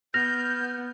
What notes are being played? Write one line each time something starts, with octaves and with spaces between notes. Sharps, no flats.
B3 F6 G6 A#6